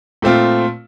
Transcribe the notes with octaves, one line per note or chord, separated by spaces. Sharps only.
A#2 A3 C4 F4